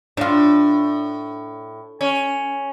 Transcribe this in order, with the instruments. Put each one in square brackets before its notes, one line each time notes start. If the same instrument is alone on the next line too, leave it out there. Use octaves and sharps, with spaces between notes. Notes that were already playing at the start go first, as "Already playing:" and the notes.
[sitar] A2 [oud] D4 F4
[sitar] C#4